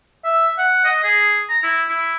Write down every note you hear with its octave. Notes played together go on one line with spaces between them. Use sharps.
E5
F#5
D#5
G#4
A#5
E4
E4